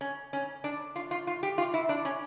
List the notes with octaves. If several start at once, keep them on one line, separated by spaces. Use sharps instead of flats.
C#4
C#4
D4
F4
F4
F4
G4
F4
E4
D4
C#4